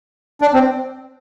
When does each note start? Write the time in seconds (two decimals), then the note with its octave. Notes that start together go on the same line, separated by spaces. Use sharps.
0.42 D4
0.54 C4